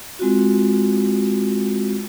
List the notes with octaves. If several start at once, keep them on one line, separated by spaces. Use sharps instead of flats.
G#3 C4 F4 F#4